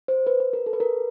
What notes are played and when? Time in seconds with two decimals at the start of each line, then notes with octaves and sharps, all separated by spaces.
0.08 C5
0.27 B4
0.40 B4
0.53 A#4
0.66 A4
0.73 B4
0.80 A#4